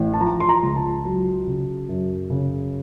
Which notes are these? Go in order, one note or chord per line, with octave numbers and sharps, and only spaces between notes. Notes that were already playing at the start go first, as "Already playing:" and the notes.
Already playing: A1
A5
F3 A#5
C6
A#5
C#2
A5
F#3
C#3
F#2
C#3